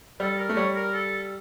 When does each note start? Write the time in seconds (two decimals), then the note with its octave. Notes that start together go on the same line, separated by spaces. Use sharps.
0.20 G3 A4
0.38 A#4
0.49 A3
0.56 G3 C#5
0.75 A#4
0.94 A4